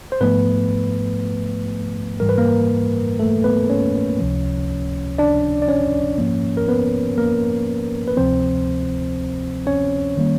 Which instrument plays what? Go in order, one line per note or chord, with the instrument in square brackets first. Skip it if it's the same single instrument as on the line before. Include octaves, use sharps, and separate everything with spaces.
[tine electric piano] C5
G#2 F3 A3 B3 B4
G#2 E3 G3 A#4
B4
A#3 A#4
A3 A4
B3 B4
C#4 C#5
C#2 C3 F3
D4 D5
D5
C#4 C#5
G#2 F3 A#3
A#4
B3 B4
A#3 A#4
B4
D2 C3 F3 C4 C5
C#4 C#5
D#3 G3 A#3